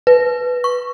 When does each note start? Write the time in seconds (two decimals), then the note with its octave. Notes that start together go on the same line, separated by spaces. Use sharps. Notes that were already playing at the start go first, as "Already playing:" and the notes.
0.07 B4
0.64 C#6